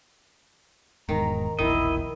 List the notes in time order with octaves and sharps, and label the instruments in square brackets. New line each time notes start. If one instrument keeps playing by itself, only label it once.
[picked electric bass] E1 G#2 [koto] D#3 [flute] A#5
[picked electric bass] E1 A#1 [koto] D#3 [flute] E4 [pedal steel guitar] D#5